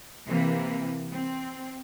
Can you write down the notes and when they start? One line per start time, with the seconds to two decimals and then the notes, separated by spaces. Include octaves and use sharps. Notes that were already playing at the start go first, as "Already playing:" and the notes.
0.24 C3 E3 A#3
1.12 C4